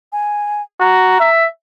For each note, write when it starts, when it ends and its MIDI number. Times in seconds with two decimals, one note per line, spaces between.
0.12 0.62 80
0.81 1.20 66
0.81 1.29 82
1.20 1.47 76